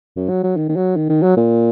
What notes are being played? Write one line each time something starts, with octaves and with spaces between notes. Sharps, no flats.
F#2
F#3
F#3
D#3
D#3
F#3
D#3
D#3
F#3
A#2